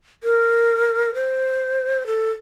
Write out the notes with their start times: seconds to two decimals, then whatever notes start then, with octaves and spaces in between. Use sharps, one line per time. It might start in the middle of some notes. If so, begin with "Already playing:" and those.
0.23 A#4
1.14 C5
2.07 A4